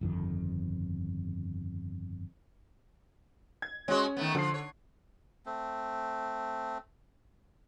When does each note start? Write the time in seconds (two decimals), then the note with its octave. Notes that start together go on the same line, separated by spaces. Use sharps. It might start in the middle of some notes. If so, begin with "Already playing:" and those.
0.01 G1 F2 D#3
3.62 G#6
3.88 G#3 C#4 F#4 C#5
4.17 D#3 A3 B3
4.35 D3 F3 C7
4.54 C#5
5.46 A3 C4